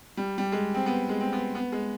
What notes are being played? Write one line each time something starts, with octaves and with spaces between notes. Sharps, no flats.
G3
G3
G#3
C4
B3
G#3
C4
B3
B3
G#3